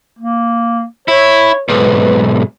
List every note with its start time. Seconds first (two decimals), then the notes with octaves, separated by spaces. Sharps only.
0.19 A#3
1.08 E4 C#5
1.69 B1 G#2 B4